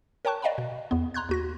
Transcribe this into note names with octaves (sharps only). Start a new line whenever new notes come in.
A#4 C#5 G5 A5 C#6 F#6
D5 D#5 F5 G5 A#5 B5
B2
E2 B3
A#5 C6 F#6 G#6
D#2 F#4 A#6